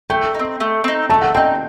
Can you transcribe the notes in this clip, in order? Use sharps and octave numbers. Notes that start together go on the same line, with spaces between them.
A3 G5
C4 D#4
A3
C4 D#4
A3 A5
F#5
C4 D#4 G5